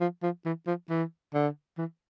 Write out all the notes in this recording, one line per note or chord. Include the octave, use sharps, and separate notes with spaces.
F3
F3
E3
F3
E3
D3
E3